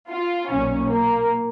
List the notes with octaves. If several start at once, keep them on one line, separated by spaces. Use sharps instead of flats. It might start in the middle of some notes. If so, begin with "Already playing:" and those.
F4
B1 A#2 C#4
A#3